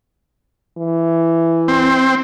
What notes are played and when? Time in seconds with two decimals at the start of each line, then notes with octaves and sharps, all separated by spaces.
0.78 E3
1.68 C4